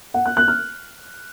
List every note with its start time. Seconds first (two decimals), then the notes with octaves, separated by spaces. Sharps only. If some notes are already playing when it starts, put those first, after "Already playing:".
0.14 F#5
0.26 F#6
0.37 F#6
0.48 F6